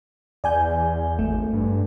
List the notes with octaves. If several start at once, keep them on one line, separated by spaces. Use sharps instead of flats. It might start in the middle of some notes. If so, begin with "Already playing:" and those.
E2 D5 G#5 G6
G#1 A3
G2